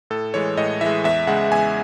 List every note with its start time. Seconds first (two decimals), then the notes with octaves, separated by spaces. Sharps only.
0.10 A2 A4
0.34 E3 G#3 C#5
0.57 A2 D#5
0.81 E3 G#3 E5
1.04 E2 E5
1.27 C#3 G#3 F#5
1.51 E2 G#5